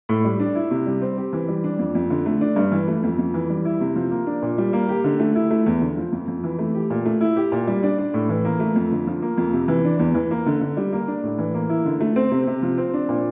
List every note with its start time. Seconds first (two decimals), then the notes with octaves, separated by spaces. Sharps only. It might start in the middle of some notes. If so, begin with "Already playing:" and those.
0.09 A2
0.25 G3
0.40 D4
0.55 E4
0.71 C3
0.87 G3
1.02 C4
1.17 G4
1.33 E3
1.48 G3
1.64 D4
1.79 F2
1.95 F2
2.10 D3
2.26 A3
2.41 D4
2.56 G2
2.72 E3
2.88 A3
3.03 F2
3.19 F2
3.34 E3
3.50 G3
3.65 E4
3.81 C3
3.96 F3
4.11 A#3
4.27 D4
4.42 A#2
4.58 G3
4.73 A#3
4.89 G4
5.04 D3
5.20 A3
5.35 E4
5.51 A3
5.66 E2
5.82 D3
5.97 F3
6.13 F2
6.28 F2
6.44 E3
6.59 A3
6.75 G4
6.90 A#2
7.06 A3
7.21 E4
7.36 G4
7.52 A#2
7.67 G3
7.83 D4
7.98 D4
8.14 A2
8.29 E3
8.45 A#3
8.60 A3
8.76 F2
8.91 D3
9.07 F3
9.22 A#3
9.38 F2
9.53 C3
9.68 E3
9.85 D4
9.99 E2
10.15 E3
10.31 A#3
10.46 D3
10.61 D3
10.77 G3
10.93 A#3
11.08 D4
11.23 A2
11.39 E3
11.54 A#3
11.69 E4
11.85 D3
12.01 A3
12.16 C4
12.31 C3
12.47 C3
12.63 F3
12.78 C4
12.94 D4
13.09 A#2